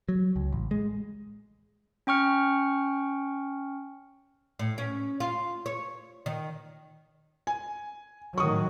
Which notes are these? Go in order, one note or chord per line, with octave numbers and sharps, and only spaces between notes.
F#3
C#2
A1
G#3
C#4 G5 C#6 F6 C#7
A2
C#4
F4
C#5
D#3
G#5
A2 D#3 F#3 C#6 D#6